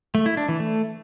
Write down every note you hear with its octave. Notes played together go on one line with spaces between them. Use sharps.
A3
E4
D4
E3
A3